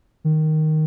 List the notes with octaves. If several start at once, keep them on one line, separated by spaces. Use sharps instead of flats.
D#3